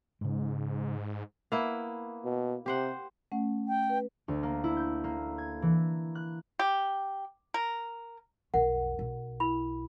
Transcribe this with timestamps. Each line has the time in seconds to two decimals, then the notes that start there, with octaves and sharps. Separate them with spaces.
0.21 G#2 C#3 G#3
1.52 A#3 B3 E4
2.24 B2
2.66 C3 G4 C5 F#5
3.32 A3 C#4 F#5
3.68 G5
3.90 B4
4.28 D2
4.43 A#3
4.64 E4
4.77 G6
5.04 A#3
5.38 G#6
5.62 E3
6.15 F#6
6.59 G4
7.54 A#4
8.54 B1 F2 A#4 F#5
8.99 B1
9.40 E4 B5